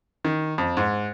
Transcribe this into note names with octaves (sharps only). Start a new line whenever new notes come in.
D#3
F2
G#2